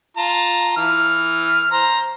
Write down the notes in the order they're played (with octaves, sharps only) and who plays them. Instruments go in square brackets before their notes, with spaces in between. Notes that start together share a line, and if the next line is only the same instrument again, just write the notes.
[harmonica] F4 A5 A#5
E3 F6
C5 A#5